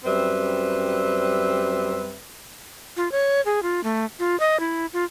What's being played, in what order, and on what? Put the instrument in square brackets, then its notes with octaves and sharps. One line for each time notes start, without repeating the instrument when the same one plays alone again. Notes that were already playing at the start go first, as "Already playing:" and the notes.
[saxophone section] F#2 G3 C4 B4 E5
[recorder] F4
C#5
G#4
F4
A3
F4
D#5
E4
F4